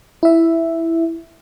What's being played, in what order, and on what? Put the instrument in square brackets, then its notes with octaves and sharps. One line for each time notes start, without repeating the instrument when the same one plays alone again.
[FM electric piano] E4 E5